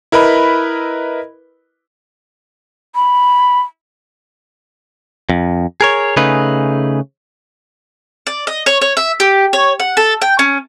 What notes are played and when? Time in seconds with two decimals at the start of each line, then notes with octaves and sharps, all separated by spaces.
0.12 E4 A#4 B4 D#5 B5
2.95 B5
5.30 F2
5.81 G#4 A#4 C#5
6.17 C#3 A3 D#4 G#4 B4
8.27 D5
8.47 D#5
8.66 C#5
8.82 C#5
8.97 E5
9.20 G4
9.53 C#5
9.80 F#5
9.97 A4
10.22 G5
10.39 C#4